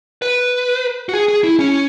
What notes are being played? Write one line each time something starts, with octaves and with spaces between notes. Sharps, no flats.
B4
F#4
G#4
G#4
E4
C#4